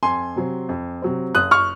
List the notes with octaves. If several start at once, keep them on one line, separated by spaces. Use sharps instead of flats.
F2 G#5 C6
C3 F#3 C4
F2
C3 F#3 C4
F#1 D#6 F#6
C#6 F6